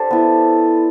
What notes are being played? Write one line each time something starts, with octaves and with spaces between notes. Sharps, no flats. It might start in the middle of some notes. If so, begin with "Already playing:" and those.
Already playing: D4 G4 A4 C5 D5
B3 E4